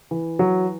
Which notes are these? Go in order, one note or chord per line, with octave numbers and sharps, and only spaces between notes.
E3
F#3